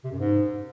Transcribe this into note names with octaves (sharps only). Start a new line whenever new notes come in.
C3
F#2
G#2